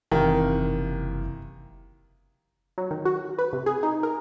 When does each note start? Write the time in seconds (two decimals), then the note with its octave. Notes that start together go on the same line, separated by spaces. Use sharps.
0.11 F#1 C3 D#3 E3 F5
2.78 F#3
2.91 D#3
3.05 F#4
3.39 B4
3.53 C3
3.66 G#4
3.83 D#4
4.03 A#4